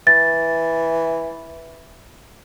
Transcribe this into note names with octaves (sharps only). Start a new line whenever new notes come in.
E3 A6